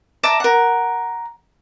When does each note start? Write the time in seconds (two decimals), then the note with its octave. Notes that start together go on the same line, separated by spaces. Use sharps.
0.23 D5 E5 A5 A#5
0.40 A#4 F#5